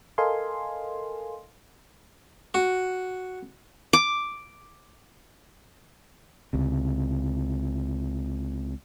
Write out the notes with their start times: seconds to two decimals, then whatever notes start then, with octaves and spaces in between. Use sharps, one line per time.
0.18 A4 A#4 D#5 F5 G#5 C6
2.54 F#4
3.93 D6
6.53 C#2 C3